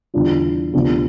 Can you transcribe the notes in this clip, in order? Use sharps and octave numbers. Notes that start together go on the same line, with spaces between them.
E2 D3 G3 D4 F4
D2 C3 F3 B3 D4